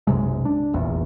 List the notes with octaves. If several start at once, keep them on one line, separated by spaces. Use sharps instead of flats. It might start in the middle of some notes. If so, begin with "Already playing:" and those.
B1 F#2 C3 G#3
D4
F1 A#1 E2